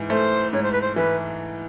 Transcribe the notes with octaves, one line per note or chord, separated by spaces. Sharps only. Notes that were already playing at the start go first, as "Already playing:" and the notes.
Already playing: G#2 E3
A3 C5
G#2 C#5
C5
B4
C5
E3 B4